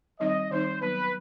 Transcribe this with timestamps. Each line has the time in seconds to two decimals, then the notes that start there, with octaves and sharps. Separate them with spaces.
0.20 D#3 G3 C4 D#4 D#5
0.51 D#3 G3 C4 D#4 C5
0.81 D#3 F#3 B3 D#4 B4